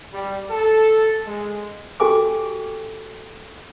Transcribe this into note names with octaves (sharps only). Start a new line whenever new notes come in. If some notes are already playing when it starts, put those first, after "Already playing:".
G3
A4
G#3
F#4 G4 A4 G5 G#5 D6